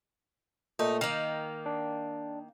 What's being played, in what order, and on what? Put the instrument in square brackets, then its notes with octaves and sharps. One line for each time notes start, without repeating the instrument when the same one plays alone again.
[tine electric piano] A#2 A3 [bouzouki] D#4
[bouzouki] D#3 A#3 [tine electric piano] F6
[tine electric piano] D4